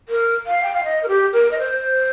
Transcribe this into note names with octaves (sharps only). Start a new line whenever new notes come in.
A#4
F5
G5
F5
D#5
A#4
G4
A#4
D#5
C5